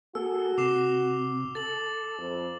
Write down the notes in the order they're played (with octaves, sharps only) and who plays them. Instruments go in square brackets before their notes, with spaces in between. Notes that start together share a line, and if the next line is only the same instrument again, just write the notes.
[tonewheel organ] A#3 G#4 A4 [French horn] F#4 [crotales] E6
[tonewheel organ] C3 [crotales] D6 C7 E7
[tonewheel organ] A4 [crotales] A6 F#7
[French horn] F2